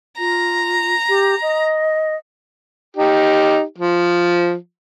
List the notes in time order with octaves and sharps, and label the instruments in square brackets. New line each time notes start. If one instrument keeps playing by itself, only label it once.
[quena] F4 [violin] A#5
[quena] G4
D#5
[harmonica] D#4 G4
F3